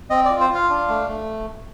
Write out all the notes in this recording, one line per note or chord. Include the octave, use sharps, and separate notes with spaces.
C4 D#5
D5
F4
C5
F4 F5
D4
A3
A3